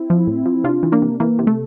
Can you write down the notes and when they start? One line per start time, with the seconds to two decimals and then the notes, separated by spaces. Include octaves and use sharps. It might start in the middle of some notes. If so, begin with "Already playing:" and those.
Already playing: C4 E4
0.10 F3
0.27 A2
0.46 F3
0.64 C3 D4 F4
0.83 E3
0.92 A#3 D4
1.02 C3
1.20 E3 A#3
1.39 C3
1.47 A3